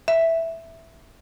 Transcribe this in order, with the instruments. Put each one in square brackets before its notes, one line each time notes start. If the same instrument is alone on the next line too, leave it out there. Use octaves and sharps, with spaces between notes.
[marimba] E5